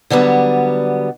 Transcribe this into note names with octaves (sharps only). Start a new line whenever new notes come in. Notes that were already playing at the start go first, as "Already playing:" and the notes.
D3 F#3 G3 B3